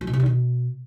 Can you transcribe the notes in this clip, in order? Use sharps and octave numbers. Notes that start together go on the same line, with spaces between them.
F#3
B2
C3
D#3
B2